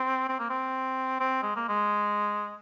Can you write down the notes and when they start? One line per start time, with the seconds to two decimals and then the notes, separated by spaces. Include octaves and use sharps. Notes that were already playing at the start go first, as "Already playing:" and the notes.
Already playing: C4
0.29 C4
0.39 A#3
0.50 C4
1.20 C4
1.43 G#3
1.56 A#3
1.69 G#3